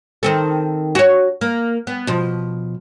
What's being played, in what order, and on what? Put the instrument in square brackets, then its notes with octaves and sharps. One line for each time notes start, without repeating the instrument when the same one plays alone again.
[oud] D#3 C4 A4
F#4 C#5
A#3
B3
B2 F3